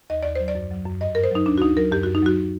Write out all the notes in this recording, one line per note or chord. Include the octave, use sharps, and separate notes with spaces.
D#2 D#5
D#2 D5
F#3 C5
D5
F#2
F#3
F#2
G2 D#5
G2 A#4
C5
F#3 D#4
D2 D4
F#4
D2 D#4
F#3 A#4
F#2 G4
F#4
F#2
D#4
F#3 F#4